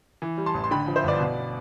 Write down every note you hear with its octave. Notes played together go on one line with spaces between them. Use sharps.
E3
G3
A5 C6
A1
C6
D3 G5 B5
F3
C5 E5
G1 B4 D5
B2